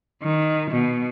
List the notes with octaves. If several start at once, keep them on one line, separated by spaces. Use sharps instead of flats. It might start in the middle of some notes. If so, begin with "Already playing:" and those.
D#3
B2